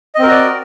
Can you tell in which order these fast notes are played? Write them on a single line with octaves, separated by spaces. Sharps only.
D#5 C4 A#4 F#4 D5